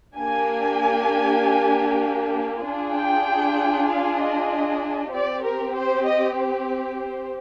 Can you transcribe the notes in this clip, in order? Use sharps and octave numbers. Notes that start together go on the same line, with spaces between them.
A#3 D4 G4 G#5
D4 F4 G#4
G5
F5
D#5
C4 G4 D5
A#4
C5
D#5
C5
C5